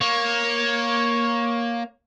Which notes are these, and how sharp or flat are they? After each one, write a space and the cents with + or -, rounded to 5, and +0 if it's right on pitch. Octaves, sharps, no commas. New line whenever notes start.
A#3 +10 C#5 +0